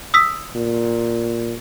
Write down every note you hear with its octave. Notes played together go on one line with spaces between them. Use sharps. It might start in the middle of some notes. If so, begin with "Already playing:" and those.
D#6 E6 B6
A#2